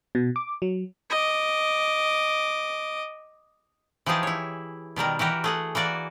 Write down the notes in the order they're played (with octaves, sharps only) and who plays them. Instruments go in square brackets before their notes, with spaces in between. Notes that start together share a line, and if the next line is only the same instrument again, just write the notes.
[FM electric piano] B2
D6
F#3
[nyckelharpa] D#5 D6
[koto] E3 F3 D#4 G4 G#4 A5
E4 C#5
B2 D#3 G3 A#4
E3 F#4 G4 A#4
A3 G#4 F#5
E3 A#3 F#4 D5